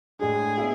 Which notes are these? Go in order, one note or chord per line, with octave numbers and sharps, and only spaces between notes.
A2 G#3 D4 G#4
B3 E4